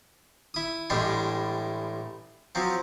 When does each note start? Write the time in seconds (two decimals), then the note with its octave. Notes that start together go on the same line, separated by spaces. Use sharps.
0.54 E4 D#6
0.90 A1 A2 G3 G#3 D4
2.55 F3 F#3 C4